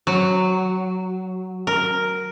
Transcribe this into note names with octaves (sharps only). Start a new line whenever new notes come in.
F#3
A#4